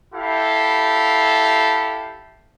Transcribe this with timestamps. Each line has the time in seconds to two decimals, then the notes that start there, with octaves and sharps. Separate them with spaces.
0.14 E4 G4 A4 F5